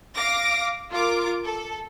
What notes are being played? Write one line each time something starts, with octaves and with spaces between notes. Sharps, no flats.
F5 D6 A#6
F4 A#4 D6
A4